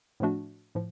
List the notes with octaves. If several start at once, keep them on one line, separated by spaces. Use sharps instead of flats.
A2 F3 A3 D4 F#4
A2 F3